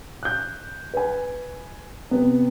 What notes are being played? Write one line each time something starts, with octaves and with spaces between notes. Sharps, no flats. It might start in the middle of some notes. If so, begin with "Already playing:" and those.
F#6 G6
B4 G#5
C3 B3